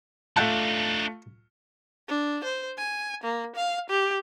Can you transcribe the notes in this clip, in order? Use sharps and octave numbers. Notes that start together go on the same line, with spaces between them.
A3 D4 D#4 F4 F#5 G5 A5
D4
C5
G#5
A#3
F5
G4